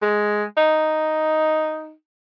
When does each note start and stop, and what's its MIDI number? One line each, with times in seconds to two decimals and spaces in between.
0.02 0.44 56
0.57 1.92 63